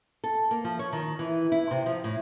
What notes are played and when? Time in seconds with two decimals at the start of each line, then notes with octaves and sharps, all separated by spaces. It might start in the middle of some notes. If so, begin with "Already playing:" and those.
0.24 A4
0.51 A#3
0.65 F3
0.79 C#5
0.93 D#3
1.19 E3
1.52 E4
1.71 C3
1.86 F3
2.04 A2